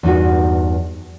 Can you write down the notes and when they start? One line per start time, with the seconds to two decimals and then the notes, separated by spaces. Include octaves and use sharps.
0.03 E2 G2 D#4 F#4